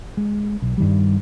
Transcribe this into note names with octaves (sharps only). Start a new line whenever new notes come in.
G#3
B1
G2 D#3 G3